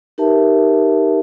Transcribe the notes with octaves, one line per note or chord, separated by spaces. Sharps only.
D#4 G4 A#4 B4 E5 A5